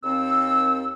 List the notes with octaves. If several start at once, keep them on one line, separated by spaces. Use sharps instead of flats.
D#2 C4 E6